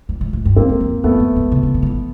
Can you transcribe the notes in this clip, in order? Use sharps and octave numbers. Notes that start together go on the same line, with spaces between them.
G2
G#2
A2
G2
F#2 A#3 C4
F#2
F2
F2 A3 B3
F#2
G#2
C3
C#3
D3
D#3
E3